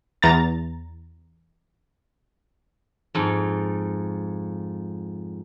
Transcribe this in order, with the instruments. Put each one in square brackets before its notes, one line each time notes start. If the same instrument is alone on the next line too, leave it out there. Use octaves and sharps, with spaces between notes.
[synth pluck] E2 A#5 A6
[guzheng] F2 G#2